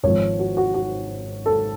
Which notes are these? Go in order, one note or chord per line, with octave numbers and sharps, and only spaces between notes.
G#1 G#2 F3 C#5
F#4
F#4
F#4
A4